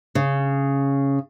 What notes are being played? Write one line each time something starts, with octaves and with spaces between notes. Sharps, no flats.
C#3